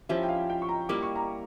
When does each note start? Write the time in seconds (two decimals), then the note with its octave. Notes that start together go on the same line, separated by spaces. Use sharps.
0.09 F3 C#4 E4 G4 E5
0.23 G5
0.29 F5
0.50 G5
0.62 C#6
0.69 A#5
0.89 G3 A#3 E4 D6
1.03 C#6
1.16 A#5